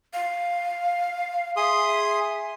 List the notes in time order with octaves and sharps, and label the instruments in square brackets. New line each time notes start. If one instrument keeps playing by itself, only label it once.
[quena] F5
[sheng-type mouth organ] G#4 C6 D#6 [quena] E5